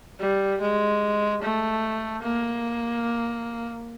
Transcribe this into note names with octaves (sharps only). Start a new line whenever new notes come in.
G3
G#3
A3
A#3